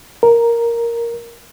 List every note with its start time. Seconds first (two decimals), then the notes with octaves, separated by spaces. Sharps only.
0.23 A#4